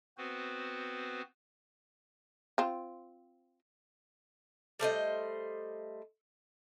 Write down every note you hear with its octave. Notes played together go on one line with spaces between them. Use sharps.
B3 C4 F#4 B4 C5
C4 F4
G3 A3 C5 D#5